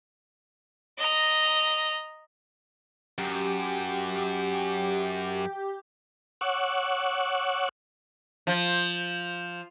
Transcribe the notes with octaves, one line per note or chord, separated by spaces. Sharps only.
D#5 A#5
F#2 G4
C#5 F#5 C#6 D6 E6 F#6
F3